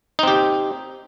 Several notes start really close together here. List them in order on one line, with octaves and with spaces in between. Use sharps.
D#4 C4 G4